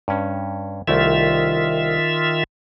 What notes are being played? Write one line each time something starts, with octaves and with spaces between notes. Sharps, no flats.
G2 C#4
C2 D#3 A3 E4 F4 E5